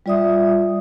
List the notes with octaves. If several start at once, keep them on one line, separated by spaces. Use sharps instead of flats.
G3 F4 D5 E5 D#6